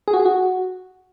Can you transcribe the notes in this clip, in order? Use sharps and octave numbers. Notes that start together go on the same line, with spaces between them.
G#4
F#4
G#4
F#4